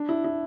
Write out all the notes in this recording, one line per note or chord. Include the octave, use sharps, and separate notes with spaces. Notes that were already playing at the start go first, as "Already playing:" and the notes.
Already playing: D4
E4
E4